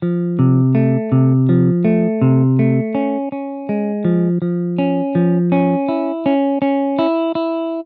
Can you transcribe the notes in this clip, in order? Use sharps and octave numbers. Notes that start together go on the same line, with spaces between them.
F3
C3
A3
C3
F3
A3
C3
A3
C#4
C#4
G#3
F3
F3
C#4
F3
C#4
E4
C#4
C#4
E4
E4